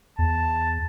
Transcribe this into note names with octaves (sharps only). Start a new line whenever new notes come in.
E2 A5